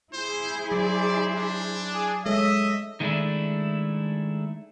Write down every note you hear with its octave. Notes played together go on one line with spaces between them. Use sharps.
E4 G#4 C5
F#3 C5 D5
D4
G#4
G#3 A4 C#5 D#5 E5
D#3 G#3 A3 C#4 D4 E4